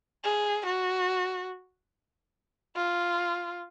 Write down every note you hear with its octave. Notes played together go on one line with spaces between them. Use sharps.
G#4
F#4
F4